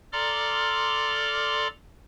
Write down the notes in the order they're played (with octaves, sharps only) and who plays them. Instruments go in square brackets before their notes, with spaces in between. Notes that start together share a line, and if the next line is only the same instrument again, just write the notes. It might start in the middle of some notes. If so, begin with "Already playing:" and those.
[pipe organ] A4 D5 A#5 C6 D6 F6